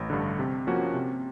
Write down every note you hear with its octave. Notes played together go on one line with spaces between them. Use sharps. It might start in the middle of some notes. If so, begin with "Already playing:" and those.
Already playing: A1
G2 D3
C3
F3 A#3 C#4 F#4
C3